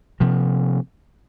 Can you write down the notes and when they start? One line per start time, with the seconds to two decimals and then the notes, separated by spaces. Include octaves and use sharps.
0.20 C3 F3 A#3